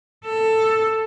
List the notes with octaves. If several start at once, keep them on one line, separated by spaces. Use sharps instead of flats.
A4